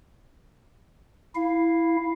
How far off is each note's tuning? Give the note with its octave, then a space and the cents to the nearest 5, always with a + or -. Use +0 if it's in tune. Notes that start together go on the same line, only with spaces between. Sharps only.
E4 +0 F5 +0